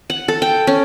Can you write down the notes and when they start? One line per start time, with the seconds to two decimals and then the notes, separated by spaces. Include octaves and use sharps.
0.10 F#5
0.28 A4
0.42 G5
0.67 C#4